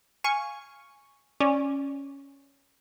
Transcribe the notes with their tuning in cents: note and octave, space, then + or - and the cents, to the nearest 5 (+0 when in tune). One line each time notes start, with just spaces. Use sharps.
F5 +0 G#5 +0 C#6 +0
C#4 +0 D5 +0